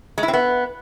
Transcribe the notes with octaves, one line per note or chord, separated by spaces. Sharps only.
G#3
E4
C4
B3